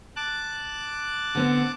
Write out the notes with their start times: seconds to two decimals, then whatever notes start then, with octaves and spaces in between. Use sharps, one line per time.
0.16 A5 D6 F#6
1.35 D3 B3 C4